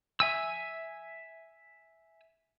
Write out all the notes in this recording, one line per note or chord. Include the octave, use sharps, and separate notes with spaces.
E5 G#5 E6